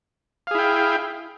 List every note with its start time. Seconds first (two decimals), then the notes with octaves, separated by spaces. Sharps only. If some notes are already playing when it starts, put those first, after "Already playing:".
0.47 F5
0.51 G#4
0.55 E4
0.59 G5